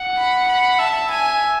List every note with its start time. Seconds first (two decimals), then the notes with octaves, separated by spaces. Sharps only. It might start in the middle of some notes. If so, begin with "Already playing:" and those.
Already playing: F#5
0.17 B5
0.49 B5
0.79 E5 A5
1.11 G#5